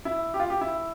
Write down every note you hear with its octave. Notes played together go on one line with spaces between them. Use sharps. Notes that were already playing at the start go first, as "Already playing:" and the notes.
E4
G4
F4
G4
E4